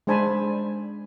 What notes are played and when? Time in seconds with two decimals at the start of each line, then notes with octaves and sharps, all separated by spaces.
0.07 G#3 D4 C5 G#5 A5 B5